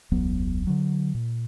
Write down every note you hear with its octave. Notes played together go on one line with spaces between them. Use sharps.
E1 C#2 F#3 B3
D3 F#3
A#2